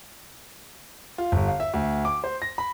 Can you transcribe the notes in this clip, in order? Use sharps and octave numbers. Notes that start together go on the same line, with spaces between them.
F4
G1
F5
E5
D2
D6
C5
A#6
B5